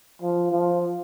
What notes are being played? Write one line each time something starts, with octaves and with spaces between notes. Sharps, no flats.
F3
F3